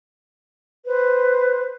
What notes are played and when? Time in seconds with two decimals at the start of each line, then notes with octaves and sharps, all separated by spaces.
0.85 B4 C5